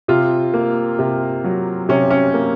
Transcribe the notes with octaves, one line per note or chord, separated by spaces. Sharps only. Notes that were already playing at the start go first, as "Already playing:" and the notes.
C3 F4
A#3
C3
F#3
C3 C#4
C#4
A#3